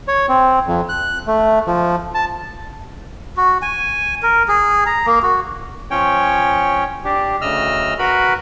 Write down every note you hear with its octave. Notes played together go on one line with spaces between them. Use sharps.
C#5
C4
F2
F#6
A3
F3
A5
F#4
G#5
A#4
G#4
A#5
A#3
F#4
F3 C#4 C#5 G5
D4 G4
D2 C#3 D#5 E6 F6
F#4 A#4 B4 B5